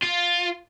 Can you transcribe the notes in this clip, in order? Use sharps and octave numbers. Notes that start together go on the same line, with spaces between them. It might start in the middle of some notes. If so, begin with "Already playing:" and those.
F4